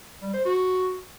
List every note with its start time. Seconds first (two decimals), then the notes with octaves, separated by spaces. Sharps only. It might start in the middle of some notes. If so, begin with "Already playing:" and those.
0.22 G3
0.34 C5
0.45 F#4